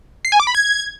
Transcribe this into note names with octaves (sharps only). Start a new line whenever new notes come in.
C7
G#5
D6
B5
G#6